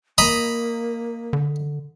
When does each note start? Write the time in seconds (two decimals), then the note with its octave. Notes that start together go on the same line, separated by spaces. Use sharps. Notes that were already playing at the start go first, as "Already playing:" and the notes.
0.18 A#3 D#5 A#5 B5
1.33 D3